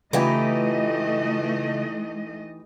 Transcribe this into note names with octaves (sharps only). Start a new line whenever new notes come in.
C#3 E3 A3 D#4 F4 G4 B4 D#5